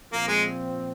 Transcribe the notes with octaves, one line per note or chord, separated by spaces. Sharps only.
A#2 F3 A#3 C4
G#3